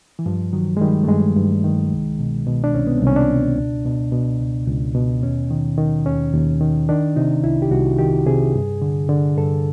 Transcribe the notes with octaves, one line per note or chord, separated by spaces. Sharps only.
E3
G2 F3
D#3 F#3
G#3
D#3 G3
A3
G2 G#3
G2
D#3
C2
B2
B2
D4
C2 C#4
B3
C4
C2 C#4
D4
B2
C#2
B2
B2
C#2
C#2
B2
D#2 C#4
D#3
D#3
D#2 C#4
D#2
D#3
D#3 D4
C3 D#4
C2 E4
G4
C2 F#4
D#3 G4
C3 G#4
G2
D3
D3
G2 A4